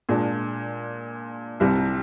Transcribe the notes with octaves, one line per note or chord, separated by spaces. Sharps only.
A#2 G#3 D4
C2 C3 G3